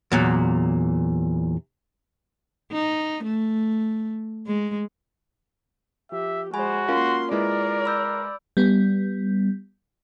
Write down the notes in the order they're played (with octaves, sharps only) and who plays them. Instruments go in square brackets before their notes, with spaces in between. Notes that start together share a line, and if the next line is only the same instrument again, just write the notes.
[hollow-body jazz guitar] E2 A#2 F#3
[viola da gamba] D#4
A3
G#3
[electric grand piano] F3 [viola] G4 [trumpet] E5
[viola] G#3 C5 [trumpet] F#4 [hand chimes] G#5 B5
[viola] A#3 C6 [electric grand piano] C#4 A#4 F5 [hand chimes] F4
[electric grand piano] G#3 E4 B4 [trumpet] A#4 [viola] D5
[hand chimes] B5 E6 G6
[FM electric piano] G3 B3